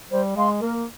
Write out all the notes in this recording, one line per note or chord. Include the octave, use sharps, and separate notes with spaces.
G3 C5
G#3 F5 C6
A#3 A#4